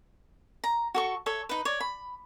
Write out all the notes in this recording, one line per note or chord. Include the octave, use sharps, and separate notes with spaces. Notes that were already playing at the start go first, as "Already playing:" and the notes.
A#5
F#4 A4 C#6
A4 C#5 E5
D#4 B4
C#5 D5
B5